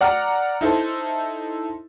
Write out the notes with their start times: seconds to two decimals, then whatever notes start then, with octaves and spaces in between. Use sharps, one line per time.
0.01 D5 F#5 A#5 F6
0.61 D#4 E4 A4 C5